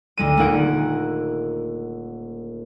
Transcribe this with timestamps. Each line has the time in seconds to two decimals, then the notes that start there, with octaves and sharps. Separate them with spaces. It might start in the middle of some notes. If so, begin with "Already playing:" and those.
0.17 D2 G#3 D#7
0.37 D#1 A#3 D#4 F#5 D7